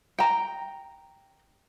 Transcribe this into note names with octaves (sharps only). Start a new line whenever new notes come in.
G5 A#5